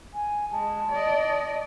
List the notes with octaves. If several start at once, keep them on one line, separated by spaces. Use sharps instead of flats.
G#5
G#3 A5
D5 D#5